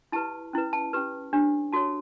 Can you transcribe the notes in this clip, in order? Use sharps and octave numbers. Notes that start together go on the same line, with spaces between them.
E4 G4 B4 A5
C#4 E4 B4
A5
C#4 G4 B4
D4 G4 C#5
F#4 A4 C#5 A5